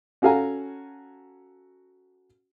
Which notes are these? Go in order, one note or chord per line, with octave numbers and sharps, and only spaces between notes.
C#4 F#4 A4 F5 G#5 A#5